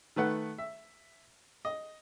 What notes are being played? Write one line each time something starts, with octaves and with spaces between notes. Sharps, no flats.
D#3 A3 B4 F#5
E5
D#5